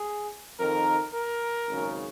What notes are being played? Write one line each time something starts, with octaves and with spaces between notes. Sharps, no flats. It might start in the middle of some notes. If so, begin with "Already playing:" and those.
Already playing: G#4
F2 D#3 A#4
A#4
G#1 F#2 C#3